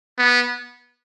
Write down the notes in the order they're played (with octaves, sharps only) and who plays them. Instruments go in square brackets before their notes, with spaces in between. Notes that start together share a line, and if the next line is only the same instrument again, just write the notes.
[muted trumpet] B3